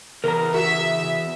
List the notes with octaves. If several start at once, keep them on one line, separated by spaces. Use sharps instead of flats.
E2 C#3 A#4 A#5
F#4 E5